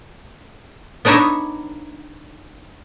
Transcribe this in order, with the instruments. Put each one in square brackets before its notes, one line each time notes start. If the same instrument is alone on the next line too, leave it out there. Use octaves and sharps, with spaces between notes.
[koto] B3 D4 D#4 C#5 E5